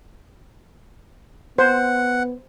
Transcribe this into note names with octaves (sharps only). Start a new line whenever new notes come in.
B3 C5 F#5